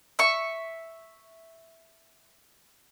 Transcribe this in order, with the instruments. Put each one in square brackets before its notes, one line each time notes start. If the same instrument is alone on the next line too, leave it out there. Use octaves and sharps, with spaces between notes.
[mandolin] E5 C#6